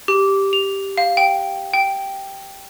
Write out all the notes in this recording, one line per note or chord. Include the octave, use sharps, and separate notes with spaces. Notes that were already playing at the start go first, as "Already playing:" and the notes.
G4
F7
F5
G5
G5